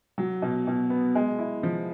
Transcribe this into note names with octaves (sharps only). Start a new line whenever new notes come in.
F#3
B2
B2
B3
G#3
E4
F3